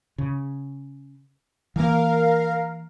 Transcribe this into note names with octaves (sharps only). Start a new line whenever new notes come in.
C#3
E3 A#3 A#4 F5